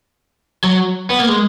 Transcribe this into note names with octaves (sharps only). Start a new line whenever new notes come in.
F#3
B3
A#3
G#3